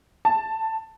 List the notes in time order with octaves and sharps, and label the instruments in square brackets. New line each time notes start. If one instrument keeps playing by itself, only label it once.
[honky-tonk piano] A5